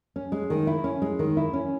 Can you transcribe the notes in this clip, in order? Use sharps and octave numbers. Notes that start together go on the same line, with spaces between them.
C#4
G#3
D#3
E4
C#4
G#3
D#3
E4
C#4